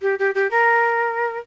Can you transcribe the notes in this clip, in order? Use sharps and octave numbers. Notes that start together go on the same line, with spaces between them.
G4
G4
G4
A#4